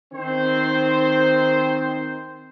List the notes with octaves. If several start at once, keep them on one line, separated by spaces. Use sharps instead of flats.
D#3 C4 C5